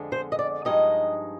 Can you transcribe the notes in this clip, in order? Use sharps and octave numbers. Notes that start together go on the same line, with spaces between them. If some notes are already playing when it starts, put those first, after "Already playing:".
Already playing: F2 D3 G#3
C5
D#5
D5
G2 F3 G#3 D#4 D#5